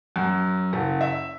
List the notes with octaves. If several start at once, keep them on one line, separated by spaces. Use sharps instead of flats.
F#2
F#1
E5